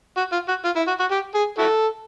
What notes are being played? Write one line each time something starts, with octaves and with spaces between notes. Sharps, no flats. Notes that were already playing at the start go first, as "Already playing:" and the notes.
F#4
F4
F#4
F4
E4
F#4
F#4
G4
G#4
E4 F#4 A4